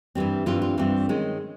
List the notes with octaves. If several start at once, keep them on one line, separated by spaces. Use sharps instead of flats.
G2 E3 G3 C4
G2 E3 G3 C4 F4
F4
G2 E3 G3 C4
D#3 G#3 C#4